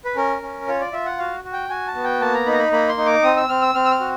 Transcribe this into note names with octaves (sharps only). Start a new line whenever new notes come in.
B4
C#4 A#4
C#4
F4 C#5
D5
F4 E5
F#5
F#4 F5
F#4
G5
F#4 G#5
A5
B3
G5
A#3 A5
A#5
D#4 B5
A#5
B5
A#3 B5
C6
D#4
D6
C4 D#6
E6
C4 F6
E6
C4 F6
E6
F6
F#4